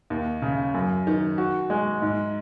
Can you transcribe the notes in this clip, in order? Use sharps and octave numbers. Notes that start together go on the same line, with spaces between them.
D#2
C#3
F#2
D#3
F#4
G#3
G#2